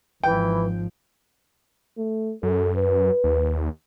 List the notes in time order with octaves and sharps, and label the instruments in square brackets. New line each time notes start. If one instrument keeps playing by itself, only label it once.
[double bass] G#1 F3 [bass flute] E3 [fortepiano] G5
[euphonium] A3
[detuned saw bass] F#2 [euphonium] A4
[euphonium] B4
[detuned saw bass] D#2